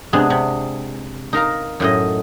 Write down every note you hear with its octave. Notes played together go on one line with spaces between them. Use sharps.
C3 G#3 B3 D4 G#4
C3
D#4 A#4 F5 A#5
F#2 A2 D#5